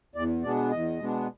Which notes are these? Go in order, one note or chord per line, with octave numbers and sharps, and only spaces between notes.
E2 D5
B2 G#3 B3 D4 D5
E2 D#5
B2 G#3 B3 D4